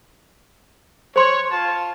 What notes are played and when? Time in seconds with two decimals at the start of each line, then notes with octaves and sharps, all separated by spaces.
1.16 C5 C#5 C6
1.52 F4 A5